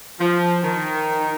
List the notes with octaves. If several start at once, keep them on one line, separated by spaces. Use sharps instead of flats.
F3
D#3